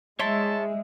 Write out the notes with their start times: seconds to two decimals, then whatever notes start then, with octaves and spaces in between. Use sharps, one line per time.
0.19 G#3 D#4 E4 C#5 E5 A5 C6